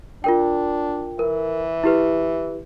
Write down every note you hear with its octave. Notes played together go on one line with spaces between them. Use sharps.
D4 F4 A#4 G5
E3 A#4
E4 G4 B4